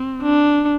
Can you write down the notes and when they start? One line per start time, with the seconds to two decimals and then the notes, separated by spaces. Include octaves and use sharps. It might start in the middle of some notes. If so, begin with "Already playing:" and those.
Already playing: C4
0.23 D4